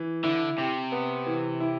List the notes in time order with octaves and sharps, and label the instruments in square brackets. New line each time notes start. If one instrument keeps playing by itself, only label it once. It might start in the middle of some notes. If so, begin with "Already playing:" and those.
Already playing: [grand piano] E3
[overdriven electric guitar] D3 [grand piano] E4
[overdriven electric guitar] C3 [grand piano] G4
[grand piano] B3
E3
E4